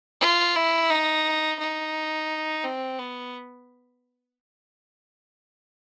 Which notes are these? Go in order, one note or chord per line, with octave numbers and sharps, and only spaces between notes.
F4
E4
D#4
D#4
C4
B3